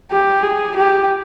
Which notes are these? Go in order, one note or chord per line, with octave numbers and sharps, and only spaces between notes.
G4
G#4
G4